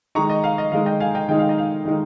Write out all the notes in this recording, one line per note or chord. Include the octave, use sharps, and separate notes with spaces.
D#3 G#3 D#4 A#5 C#6
D#5
F5
D#5
D#3 G#3 D#4 F5
D#5 G5
F5 G#5
D#5 G5
D#3 G#3 D#4 G5
F5
D#5
F5
D#3 G#3 D#4